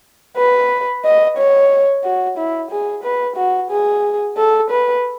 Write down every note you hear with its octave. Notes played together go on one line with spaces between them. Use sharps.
B4
D#5
C#5
F#4
E4
G#4
B4
F#4
G#4
A4
B4